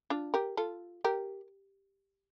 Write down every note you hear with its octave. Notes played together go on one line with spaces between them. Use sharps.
D4 F4
G4 A#4
F4 A4
G4 A#4